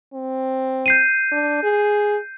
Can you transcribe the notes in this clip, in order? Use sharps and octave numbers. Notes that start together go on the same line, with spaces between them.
C4
G6 C7 D#7
D4
G#4